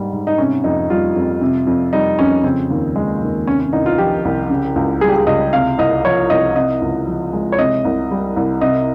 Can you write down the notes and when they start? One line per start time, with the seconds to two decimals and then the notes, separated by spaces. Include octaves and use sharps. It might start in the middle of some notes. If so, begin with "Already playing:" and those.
Already playing: G#2 G3
0.13 G#2
0.27 D#4
0.38 C3 C#4
0.64 F2 D#4
0.90 G3 F4
1.16 F2
1.42 C3
1.67 F2
1.93 G3 D#4
2.18 F2 C#4
2.44 C#3 C4
2.70 D#2
2.96 G#3
3.22 D#2
3.47 C3 C#4
3.60 C#4
3.73 C2 D#4
3.86 F4
3.98 F3 G4
4.25 C2
4.50 C#3
4.76 C#2
5.01 G3 G#4
5.09 G4
5.16 G#4
5.27 C#2 D#5
5.53 C3 F5
5.78 C2 D#5
6.05 F3 C#5
6.30 C2 D#5
6.56 C3 D#5
6.81 C#2
7.07 F3
7.33 G#3
7.52 C#5
7.59 C3 D#5
7.85 C2
8.11 G3
8.36 C2
8.61 C3 D#5